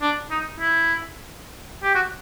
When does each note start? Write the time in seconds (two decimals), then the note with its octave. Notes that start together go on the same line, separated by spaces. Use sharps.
0.02 D4
0.31 D#4
0.61 E4
1.83 G4
1.95 F#4